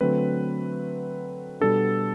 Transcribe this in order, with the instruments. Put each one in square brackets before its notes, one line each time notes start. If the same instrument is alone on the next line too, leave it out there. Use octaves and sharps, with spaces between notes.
[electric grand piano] D3 F#3 A3 C4 B4
B2 G3 B3 D4 A4